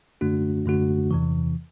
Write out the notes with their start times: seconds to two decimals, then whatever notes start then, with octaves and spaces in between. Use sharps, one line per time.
0.21 F#2 D3 A3 D4 F#4
0.66 F#2 D3 A3 D4 F#4
1.11 E2 C3 E3